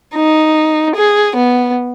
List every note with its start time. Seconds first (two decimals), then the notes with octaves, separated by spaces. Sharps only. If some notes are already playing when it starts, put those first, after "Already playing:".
0.15 D#4
0.96 G#4
1.36 B3